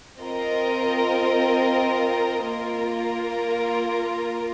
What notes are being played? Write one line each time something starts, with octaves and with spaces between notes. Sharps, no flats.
C4 F4 A#4 D#5
A#3 F4 A#4